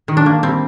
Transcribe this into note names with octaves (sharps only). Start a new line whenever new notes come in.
D#3
D4
A#3
G3 C4